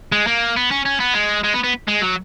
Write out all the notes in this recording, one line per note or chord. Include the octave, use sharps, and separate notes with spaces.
G#3
A#3
B3
C#4
C#4
B3
G#3
G#3
B3
B3
G#3
F#3